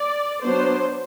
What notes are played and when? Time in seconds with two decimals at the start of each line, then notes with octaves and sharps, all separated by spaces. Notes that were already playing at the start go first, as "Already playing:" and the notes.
Already playing: D5
0.42 F#3 B3 D4 C5